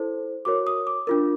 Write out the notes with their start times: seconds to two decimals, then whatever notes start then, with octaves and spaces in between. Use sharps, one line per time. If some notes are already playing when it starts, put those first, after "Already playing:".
Already playing: E4 A4 C5
0.45 F#4 A#4 C#5 D6
0.67 D#6
0.87 D6
1.07 D4 F4 A#4